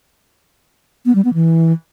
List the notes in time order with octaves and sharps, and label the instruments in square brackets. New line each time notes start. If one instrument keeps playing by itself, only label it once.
[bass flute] B3
G3
B3
E3